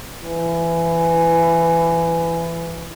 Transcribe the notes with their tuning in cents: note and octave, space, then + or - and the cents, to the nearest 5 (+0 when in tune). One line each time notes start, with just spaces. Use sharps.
E3 +20